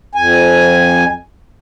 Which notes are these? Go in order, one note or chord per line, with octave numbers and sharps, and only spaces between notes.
F2 G#5